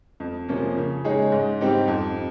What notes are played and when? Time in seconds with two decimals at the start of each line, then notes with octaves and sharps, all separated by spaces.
0.20 F2
0.49 C3 F3 A#3 C#4
0.77 C#3
1.04 G#3 D#4 G#4 C#5
1.32 G#2
1.61 G3 C4 D#4 G4
1.88 F2